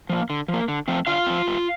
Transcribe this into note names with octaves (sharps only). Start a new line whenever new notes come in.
F3 A#3
D3
F3
A#3
D3
F3 A3 C4
D3 F4 F5
F3 A3 C4
G2